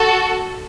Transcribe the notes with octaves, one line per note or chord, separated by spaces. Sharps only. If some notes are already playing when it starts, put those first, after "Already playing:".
Already playing: F#4 A4